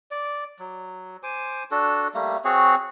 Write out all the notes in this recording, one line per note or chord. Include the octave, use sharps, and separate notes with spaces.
D5
F#3
C5 G#5 D6
D4 F#4 A4
G3 A3 A#3
C4 F#4 G#4 C#5